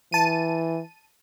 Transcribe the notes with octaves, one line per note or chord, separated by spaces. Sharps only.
E3 A5 D#7